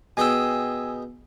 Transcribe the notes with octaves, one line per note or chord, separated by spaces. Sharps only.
B2 G#4 G5 G#5 E6